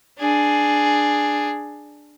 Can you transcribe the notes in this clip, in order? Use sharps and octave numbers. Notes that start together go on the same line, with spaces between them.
D4 G#4